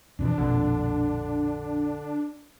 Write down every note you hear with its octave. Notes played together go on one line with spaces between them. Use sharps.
F2 B2 E3 D4
A#1 F2 B2 D3